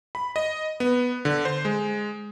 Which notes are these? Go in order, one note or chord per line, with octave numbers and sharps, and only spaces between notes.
B5
D#5
B3
D3
C5
G#3